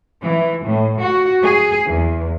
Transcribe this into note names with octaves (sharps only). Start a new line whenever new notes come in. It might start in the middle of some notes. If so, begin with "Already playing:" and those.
E3
A2
F#4
G#4
E2